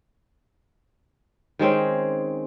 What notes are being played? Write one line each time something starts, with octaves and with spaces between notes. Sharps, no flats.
D#3 G#3 C4 C#4